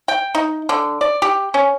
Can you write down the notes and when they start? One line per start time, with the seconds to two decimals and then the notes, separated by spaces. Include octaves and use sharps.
0.08 G5
0.35 D#4
0.69 D3
1.01 D5
1.22 G4
1.54 C#4